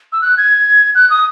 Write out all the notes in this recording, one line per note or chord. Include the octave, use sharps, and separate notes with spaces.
E6
F#6
G#6
F#6
D#6